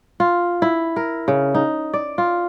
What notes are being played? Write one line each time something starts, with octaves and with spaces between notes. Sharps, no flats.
F4
E4
A#4
C#3
D#4
D5
F4